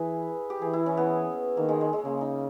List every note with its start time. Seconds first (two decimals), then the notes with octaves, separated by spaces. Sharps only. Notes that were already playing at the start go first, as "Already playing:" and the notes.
Already playing: E3 E4 G#4 B4
0.50 G4
0.62 E3 G#4
0.73 E4
0.86 C#4
0.97 B3
1.57 D#3 A#3
1.69 G#3
1.81 G#3
1.93 G#3
2.05 C#3 A#3
2.21 D#4